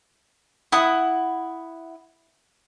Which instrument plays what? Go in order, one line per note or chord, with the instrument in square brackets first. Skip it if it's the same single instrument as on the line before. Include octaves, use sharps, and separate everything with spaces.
[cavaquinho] E4 F#5 D#6